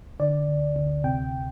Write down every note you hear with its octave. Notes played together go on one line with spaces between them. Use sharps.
D3 D5
D2
D2
C3 G5